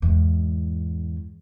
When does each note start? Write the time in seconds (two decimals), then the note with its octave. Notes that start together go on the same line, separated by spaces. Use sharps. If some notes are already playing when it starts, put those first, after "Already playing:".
0.02 E2 G#2